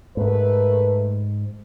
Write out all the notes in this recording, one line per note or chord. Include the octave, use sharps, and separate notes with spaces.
G#2 A3 A#4 B4